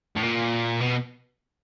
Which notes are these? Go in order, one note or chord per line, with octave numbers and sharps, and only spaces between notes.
A2
A#2
B2